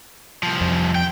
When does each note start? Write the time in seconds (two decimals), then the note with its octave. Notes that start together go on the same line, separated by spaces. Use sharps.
0.43 C2 F3
0.61 F2
0.95 G5